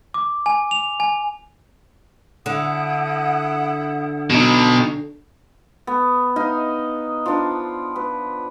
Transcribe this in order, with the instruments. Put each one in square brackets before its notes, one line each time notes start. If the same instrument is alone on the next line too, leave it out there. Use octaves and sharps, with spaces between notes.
[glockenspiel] D6
G#5
F7
G#5
[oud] D3 [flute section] E4 F#5 D#6
[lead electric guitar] B2 D#4
[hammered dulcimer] B3
D#4 D#5 F5
F3 D4
B4